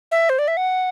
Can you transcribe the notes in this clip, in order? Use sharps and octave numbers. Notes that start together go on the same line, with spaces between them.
E5
C5
D5
E5
F#5